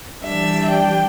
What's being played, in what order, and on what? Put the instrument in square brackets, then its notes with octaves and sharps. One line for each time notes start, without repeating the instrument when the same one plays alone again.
[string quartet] E3 G3 D4 E5
G5